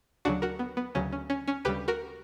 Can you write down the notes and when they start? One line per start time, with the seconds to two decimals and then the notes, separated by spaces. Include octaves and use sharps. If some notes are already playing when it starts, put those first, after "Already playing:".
0.25 D2 C#3 F#3 D4 F#4
0.42 F#4 A#4
0.59 B3
0.77 B3
0.95 D2 C#3 F#3 C#4
1.12 C#4
1.30 C#4
1.48 C#4
1.65 D2 C#3 G3 G4 B4
1.88 F#4 A#4